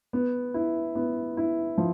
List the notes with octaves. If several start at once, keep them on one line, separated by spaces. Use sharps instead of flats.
B3
E4
B3
E4
F3